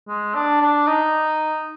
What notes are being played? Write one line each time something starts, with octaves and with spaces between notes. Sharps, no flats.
G#3
D4
D4
D#4